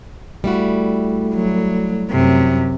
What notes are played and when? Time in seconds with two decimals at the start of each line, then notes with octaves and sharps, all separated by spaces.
0.44 G3 A3 E4 F#4
1.35 F#3
2.11 F#2 C3